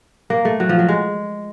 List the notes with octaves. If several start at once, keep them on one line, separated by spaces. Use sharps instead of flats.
A#3
A3
F#3
F3
F#3
G#3